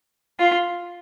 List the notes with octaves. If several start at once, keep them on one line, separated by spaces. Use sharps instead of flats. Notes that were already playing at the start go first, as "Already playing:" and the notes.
F4